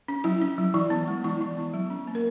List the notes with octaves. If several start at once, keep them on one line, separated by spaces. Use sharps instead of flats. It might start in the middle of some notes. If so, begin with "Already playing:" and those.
C#4
F#3 E4
C#4
F#3
E3 E4
B3
G#3
E3 E4
E3
B3
F#3
C#4
A#3
A#4